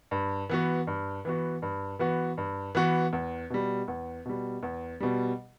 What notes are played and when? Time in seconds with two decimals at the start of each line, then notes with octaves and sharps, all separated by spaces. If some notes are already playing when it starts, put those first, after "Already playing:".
0.11 G2
0.49 E3 B3 F#4
0.87 G2
1.25 E3 B3 F#4
1.62 G2
1.99 E3 B3 F#4
2.38 G2
2.75 E3 B3 F#4
3.13 E2
3.50 B2 G3
3.88 E2
4.26 B2 G3
4.63 E2
5.00 B2 G3